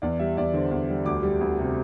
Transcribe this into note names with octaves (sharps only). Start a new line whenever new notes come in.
E2 D5
G3 E5
E2 D5
D3 C5
E2
G3
D2 D6
G3
D2
C3